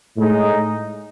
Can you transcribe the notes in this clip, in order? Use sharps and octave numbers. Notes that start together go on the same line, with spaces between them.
A2 G#3 D#4